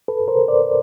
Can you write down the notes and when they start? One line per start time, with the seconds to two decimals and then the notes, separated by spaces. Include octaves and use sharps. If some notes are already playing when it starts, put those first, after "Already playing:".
0.08 A4 B4
0.28 A#4 C5
0.48 C5 D5